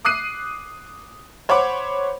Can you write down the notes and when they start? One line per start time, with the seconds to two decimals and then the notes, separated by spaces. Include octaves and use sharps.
0.05 D6 D#6 F#6 C7 D#7
1.49 C5 C#5 F#5 B5 D6